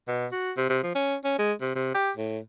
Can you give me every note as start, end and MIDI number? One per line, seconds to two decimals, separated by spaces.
0.08 0.27 47
0.32 0.52 66
0.57 0.69 48
0.69 0.79 48
0.83 0.94 53
0.95 1.16 61
1.24 1.37 61
1.39 1.53 56
1.61 1.75 48
1.75 1.91 48
1.94 2.11 67
2.16 2.39 45